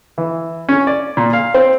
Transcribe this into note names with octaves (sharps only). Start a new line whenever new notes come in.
E3
C#4
D5
A#2
F5
C4